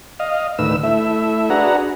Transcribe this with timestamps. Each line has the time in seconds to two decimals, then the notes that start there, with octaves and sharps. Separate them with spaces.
0.20 D#5 F5
0.59 D2 A2 D#3 B4 E6
0.83 A3 E4 E5
1.50 D4 F#4 G#4 B4 F#5 A#5